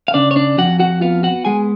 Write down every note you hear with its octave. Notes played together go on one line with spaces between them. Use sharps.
F5
C#3 D4 D5
C#5
D4 D5
F2 F#4 F#5
F#4 F#5
B3 F4 F5
F#4 F#5
G#3 G#4 G#5